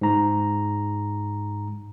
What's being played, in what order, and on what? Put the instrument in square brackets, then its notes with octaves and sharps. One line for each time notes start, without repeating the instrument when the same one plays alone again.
[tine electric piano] G#2 A#5